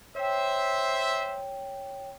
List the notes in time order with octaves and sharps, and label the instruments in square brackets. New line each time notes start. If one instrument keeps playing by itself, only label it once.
[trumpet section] C5 E5 [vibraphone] C#5 G5